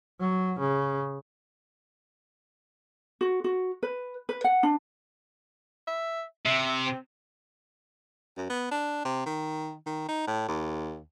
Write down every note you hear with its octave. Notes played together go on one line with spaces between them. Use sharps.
F#3
C#3
F#4
F#4
B4
B4
F#5
D4
E5
C3 E5
C4
F#2
B3
D4
C3
D#3
D#3
D#4
A2
D#2